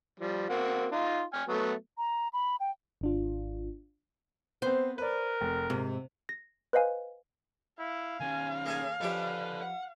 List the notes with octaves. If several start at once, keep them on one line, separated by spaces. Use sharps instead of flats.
F3 G3
A#3 C4 F#4
D#4 F4
G5 G#5 F6
F#3 A3 B3
A#5
B5
G5
G#1 D4 F4
B3 C4 C5
A#4 B4 D5
F1
G#2 C3
A#6
B4 C5 D#5 F5 G#5
E4 F5
D#3 C#4 G#5
A#3 G#4 A4 G#5
F2 C#4 G4 A4 B4 D5
F#5